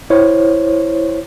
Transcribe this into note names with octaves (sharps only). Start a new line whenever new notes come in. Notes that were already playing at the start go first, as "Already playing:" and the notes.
E4 C5 C#5